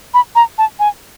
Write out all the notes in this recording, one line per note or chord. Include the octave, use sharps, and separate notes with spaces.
B5
A#5
A5
G#5